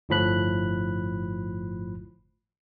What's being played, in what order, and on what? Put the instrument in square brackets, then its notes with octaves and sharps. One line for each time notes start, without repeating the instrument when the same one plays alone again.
[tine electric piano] G1 A2 F3 B5 F#6